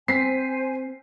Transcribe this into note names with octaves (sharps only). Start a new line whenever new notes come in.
C4 C5 G#5 B6 C7